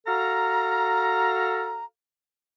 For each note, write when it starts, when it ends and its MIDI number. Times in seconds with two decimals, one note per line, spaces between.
0.07 1.83 66
0.07 1.83 69
0.07 1.83 77
0.07 1.83 82